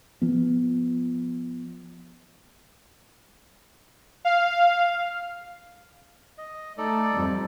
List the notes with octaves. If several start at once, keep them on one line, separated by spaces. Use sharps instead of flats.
F3 B3
F5
D#5
A3 D#4 A4 D5
F2 G3